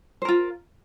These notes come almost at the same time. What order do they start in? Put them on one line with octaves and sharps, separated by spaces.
C5 A#4 F4